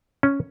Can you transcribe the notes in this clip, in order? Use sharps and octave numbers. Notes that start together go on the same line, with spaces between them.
C#4